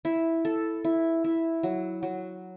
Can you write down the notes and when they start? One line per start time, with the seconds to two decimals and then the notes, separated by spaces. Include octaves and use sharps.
0.05 E4
0.45 A4
0.84 E4
1.24 E4
1.63 F#3
2.03 F#3